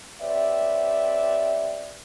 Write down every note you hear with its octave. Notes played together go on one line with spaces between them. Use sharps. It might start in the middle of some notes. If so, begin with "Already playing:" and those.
C4 G4 B4 C#5 D5 E5